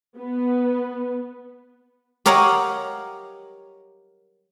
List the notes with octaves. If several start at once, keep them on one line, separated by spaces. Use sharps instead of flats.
B3
G4 A#4 C#5 D#5 F5 F#5